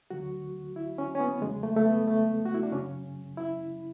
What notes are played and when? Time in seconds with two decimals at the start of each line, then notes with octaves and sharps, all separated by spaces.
0.10 D2 D3 F#3 F#4
0.76 E4
0.98 C#4
1.15 C#4
1.20 B3
1.42 E2 C#3 F#3 G#3
1.63 A3
1.76 A3
1.85 B3
2.07 A3
2.46 F#4
2.54 E4
2.63 D4
2.72 F#2 C#3 F#3 C#4
3.37 E4